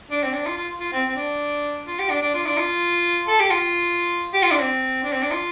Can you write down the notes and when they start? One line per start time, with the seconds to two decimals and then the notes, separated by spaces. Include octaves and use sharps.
0.10 D4
0.23 C4
0.33 D4
0.46 F4
0.57 F4
0.80 F4
0.93 C4
1.09 C4
1.16 D4
1.87 F4
1.99 G4
2.10 D4
2.22 D4
2.34 F4
2.46 D4
2.57 F4
3.27 A4
3.40 G4
3.51 F4
4.33 G4
4.43 F4
4.51 D4
4.59 C4
5.03 D4
5.12 C4
5.22 D4
5.31 F4